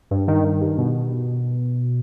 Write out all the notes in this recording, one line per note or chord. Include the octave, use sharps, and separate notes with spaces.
G2
D#3
D#3
G2
B2